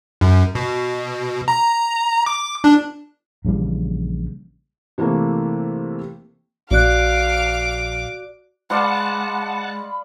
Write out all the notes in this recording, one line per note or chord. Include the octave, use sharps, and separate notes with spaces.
F#2
B2
A#5
D6
D4
A#1 C#3 E3 G3
C3 E3 A3 A#3
A#1 F#4 D5 F5 D6 F#6
G#3 D5 F5 F#5 A5 B5 C6